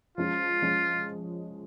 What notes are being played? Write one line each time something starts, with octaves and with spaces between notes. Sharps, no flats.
F3 G#3 C#4 F4
F3 G#3 C#4